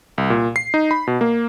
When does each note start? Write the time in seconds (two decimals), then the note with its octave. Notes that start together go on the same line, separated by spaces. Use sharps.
0.18 C2
0.30 A#2
0.56 C7
0.74 D#4
0.91 B5
1.07 B2
1.21 A#3